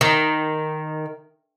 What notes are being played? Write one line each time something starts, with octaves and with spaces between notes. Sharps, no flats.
D#3